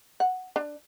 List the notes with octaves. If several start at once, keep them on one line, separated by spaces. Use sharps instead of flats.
F#5
D4